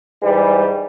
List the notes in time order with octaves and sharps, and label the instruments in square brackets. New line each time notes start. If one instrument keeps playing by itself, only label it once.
[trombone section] G#2 E3 G3